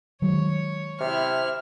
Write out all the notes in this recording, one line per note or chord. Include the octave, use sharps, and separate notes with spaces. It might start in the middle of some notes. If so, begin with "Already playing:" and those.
D#3 F#3 G#3 C#5
C3 E4 F6